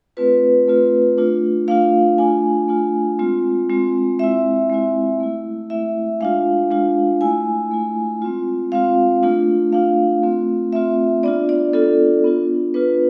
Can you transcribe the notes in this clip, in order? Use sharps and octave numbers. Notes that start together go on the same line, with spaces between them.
A3 C4 F4 B4
A3 C4 F4
A3 D4 F4
A3 D4 F4 F5
A3 D4 F4 G#5
A3 D4 F4
G#3 C4 F4
G#3 C4 F4
G#3 C4 E4 E5
G#3 C4 E4
A3 E4
A3 E4 E5
G#3 D4 F4 F5
G#3 D4 F4
A3 E4 G#5
A3 E4
G#3 C4 F4
G#3 C4 F4 F5
A3 D4 F4
A3 D4 F4 F5
A3 C4 F4
A3 C4 F4 E5
B3 D4 F4 D5
D5
B3 D4 F4 A4
B3 D4 F4
B3 D4 F4 B4